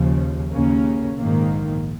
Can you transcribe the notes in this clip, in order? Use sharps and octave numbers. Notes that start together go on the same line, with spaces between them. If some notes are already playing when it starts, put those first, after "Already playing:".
Already playing: D#2 C#3 F3
D#2 C#3 A#3 C#4
A#1 G#2 D#3 A#3